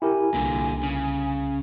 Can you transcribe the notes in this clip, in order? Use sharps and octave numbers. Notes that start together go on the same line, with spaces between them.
E4 G4 A#4 G#5
C2 A#2 D3
C#3